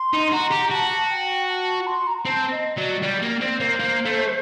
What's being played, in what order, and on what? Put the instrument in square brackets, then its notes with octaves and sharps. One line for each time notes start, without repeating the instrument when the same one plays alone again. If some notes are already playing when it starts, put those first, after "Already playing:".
Already playing: [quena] C6
[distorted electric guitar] D#4
[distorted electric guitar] F#4 [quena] A#5
[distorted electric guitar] G4
[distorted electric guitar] F#4 [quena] A5
[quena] G5
A5
A5
C6
A#5
A#5
[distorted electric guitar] C4 [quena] A5
[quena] D#5
[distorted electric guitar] F#3 [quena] D5
[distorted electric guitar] G3 [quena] D5
[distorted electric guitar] A#3
[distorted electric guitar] C4 [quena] D5
[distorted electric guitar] A#3 [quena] C5
[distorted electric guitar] A#3
A3